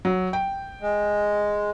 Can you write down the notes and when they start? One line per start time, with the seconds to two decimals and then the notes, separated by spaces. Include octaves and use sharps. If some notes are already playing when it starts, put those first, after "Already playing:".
0.05 F#3
0.33 G5
0.82 G#3